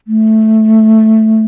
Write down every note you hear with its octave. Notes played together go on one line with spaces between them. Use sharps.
A3